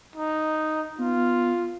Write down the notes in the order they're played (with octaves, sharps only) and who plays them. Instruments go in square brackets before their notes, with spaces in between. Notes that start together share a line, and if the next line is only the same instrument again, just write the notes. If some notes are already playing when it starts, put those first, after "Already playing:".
[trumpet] D#4
[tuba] B3 [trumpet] F4